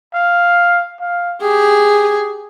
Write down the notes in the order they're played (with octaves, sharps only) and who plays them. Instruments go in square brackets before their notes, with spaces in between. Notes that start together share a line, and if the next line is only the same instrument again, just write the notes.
[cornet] F5
F5
[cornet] G4 [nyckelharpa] G#4